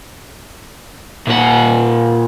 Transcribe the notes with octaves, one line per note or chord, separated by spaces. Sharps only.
A#2 F#5